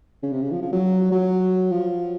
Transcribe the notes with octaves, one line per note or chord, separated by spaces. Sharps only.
C#3
C3
C#3
F3
F3
F#3
F#3
F3